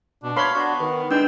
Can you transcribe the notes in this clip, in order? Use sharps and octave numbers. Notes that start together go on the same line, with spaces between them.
B2 D4
C#5 F5 B5 C6
B3 D4 F#4 C#6
D#3 B4
G#3 D4 D#4 B4 G5 E6